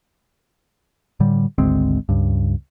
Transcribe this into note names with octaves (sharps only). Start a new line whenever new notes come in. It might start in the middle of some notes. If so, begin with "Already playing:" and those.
A2 D3 G3
G#1 D2 G#3 C4
C#2 G2